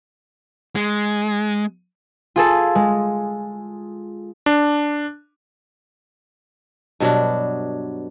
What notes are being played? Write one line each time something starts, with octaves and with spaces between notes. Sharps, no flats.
G#3
F4 G#4 A4
G#3
D4
G2 B2 F#3 D4